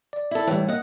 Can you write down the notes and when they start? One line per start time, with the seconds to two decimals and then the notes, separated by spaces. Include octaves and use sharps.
0.13 D5
0.31 E4 A4
0.47 A2 E3 G3
0.68 A#3 D#5 F#5